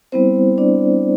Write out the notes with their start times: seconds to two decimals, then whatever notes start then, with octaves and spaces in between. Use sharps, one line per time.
0.12 G3 B3 C4 E4 C5
0.58 D4 D5